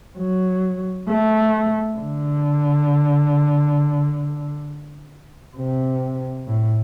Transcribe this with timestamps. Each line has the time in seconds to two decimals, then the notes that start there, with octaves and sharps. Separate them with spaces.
0.18 F#3
1.08 A3
1.98 D3
5.56 C3
6.47 A2